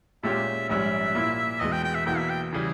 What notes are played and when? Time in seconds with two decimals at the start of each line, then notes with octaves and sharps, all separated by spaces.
0.23 A#2 G#3 C#4 G4 E5
0.69 A#1 G#2 G3 C#4 E5
1.15 A#2 A#3 E4
1.60 E2 B2 G#3 D#5
1.72 G5
1.84 G5
1.95 E5
2.06 E2 B2 A#3 E4 G5
2.17 E5
2.29 G5
2.52 C#3 E3 G3 G#4